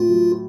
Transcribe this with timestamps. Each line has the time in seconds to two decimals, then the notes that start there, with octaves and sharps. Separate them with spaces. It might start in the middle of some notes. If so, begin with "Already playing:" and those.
Already playing: A2 F4
0.09 F#3